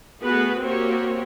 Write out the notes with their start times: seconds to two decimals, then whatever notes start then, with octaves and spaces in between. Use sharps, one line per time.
0.23 A3 B3 F#4 G#4 B4
0.63 A#3 C4 F#4 G4 C#5